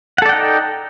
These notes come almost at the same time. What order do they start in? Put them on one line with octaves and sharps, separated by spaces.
F#5 A4 D5 G5 D#4